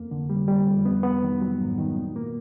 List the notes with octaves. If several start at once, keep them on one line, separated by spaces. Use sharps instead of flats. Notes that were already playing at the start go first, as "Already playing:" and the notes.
Already playing: F2 A#3
D3
G3
G3
F2
B3
B3
D#3
F#3
G#2
D#3
A#2
A#3